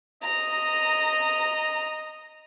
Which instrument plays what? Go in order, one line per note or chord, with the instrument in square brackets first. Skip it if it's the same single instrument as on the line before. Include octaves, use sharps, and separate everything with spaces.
[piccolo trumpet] D#5 [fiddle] A#5